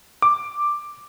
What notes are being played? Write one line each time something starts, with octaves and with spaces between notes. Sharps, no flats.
D6